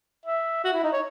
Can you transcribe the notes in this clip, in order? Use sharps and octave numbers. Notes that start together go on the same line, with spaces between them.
E5
F#4
E4
D#4
C#5